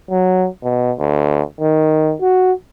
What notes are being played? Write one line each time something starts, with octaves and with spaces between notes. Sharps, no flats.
F#3
B2
D2
D#3
F#4